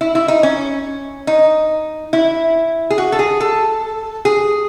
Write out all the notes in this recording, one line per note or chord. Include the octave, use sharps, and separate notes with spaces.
E4
E4
D#4
C#4
D#4
E4
G#4
F#4
A4
G#4
A4
G#4